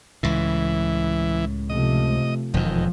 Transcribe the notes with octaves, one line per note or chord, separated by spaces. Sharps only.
C#2 A2 E3
C3 F3 A3 D#5
E1 F2 D#3 F3